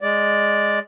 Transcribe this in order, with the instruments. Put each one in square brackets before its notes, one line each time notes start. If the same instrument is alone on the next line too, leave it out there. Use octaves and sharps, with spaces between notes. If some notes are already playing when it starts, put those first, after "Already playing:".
[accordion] G#3 D5